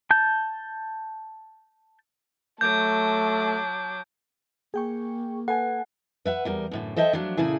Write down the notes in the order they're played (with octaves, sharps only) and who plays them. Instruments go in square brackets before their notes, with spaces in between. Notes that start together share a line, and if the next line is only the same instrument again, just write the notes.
[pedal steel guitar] A5 G6
[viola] F#3 D6 [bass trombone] A3 [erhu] A5 [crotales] G6
[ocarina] A#3 [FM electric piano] G#4 G5 C#6
[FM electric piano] A4 B4 G#5 [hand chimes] F#5
[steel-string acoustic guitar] B4 E5 F#5
E2 G3 A#4
F#2 A2 D3
A4 C5 D#5 E5 G5 A5
F3 F#3 A3 D4
A#2 C#3 A3 E4 G#4